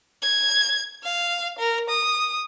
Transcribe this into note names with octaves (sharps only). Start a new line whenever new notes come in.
G#6
F5
A#4
D#6